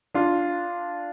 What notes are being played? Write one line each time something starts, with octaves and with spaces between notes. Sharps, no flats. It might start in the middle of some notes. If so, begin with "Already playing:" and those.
D4 F4